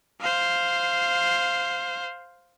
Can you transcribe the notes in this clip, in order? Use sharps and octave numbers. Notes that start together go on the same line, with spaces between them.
C5 F5